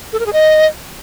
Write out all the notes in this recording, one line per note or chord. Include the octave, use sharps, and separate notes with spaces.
A4
A#4
G#4
D#5